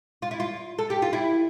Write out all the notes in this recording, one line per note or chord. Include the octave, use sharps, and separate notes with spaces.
F4
E4
F4
A4
G4
F4
E4